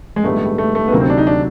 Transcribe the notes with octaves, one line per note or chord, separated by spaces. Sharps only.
G#3
A#1 G#2 D#3 G3 A3 B3
A3
A3
B3
D2 C3 D#3 F#3 A#3
C4
D4
D#4
D4